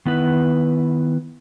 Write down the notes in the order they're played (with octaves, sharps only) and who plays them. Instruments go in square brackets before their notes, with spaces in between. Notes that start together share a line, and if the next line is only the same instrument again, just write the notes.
[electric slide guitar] D#3 B3 E4 B4